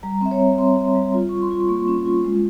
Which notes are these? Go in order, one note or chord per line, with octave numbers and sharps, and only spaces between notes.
G3 A#5
C4 E5
C#5
C4
C4 C6
C4
G3
F4
F4 C#6
C6
F4
A#3 C#6
C#4
F4
G#3